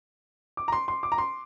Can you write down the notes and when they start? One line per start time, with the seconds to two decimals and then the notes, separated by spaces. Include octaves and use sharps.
0.57 D6
0.68 A#5
0.72 C6
0.88 C6
1.03 D6
1.12 A#5
1.18 C6